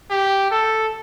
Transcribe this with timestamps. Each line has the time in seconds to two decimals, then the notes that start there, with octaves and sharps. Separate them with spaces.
0.10 G4
0.51 A4